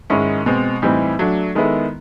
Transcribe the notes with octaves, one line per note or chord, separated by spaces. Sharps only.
G#2 D#3 G#3 C#4 E4
B2 G#3 C4
A2 E3 G3 C4 D#4
F#3 A3 D4
D#3 G#3 B3 E4 A4